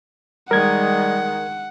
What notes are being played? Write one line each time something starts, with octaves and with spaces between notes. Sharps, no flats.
D#3 G3 G#3 A#4 F#5 G#6